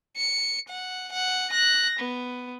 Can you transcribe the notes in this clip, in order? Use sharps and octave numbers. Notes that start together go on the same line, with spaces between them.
C#7
F#5
F#5
F#6 A#6
B3